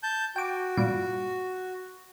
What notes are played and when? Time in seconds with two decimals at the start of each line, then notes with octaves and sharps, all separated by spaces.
0.03 A5 G6
0.36 F#4 G5 D6
0.77 G2 A#2 D7